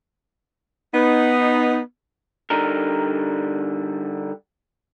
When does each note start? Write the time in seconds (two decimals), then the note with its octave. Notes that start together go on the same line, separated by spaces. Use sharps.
0.94 B3 D#4
2.50 D3 G3 D#4 A#4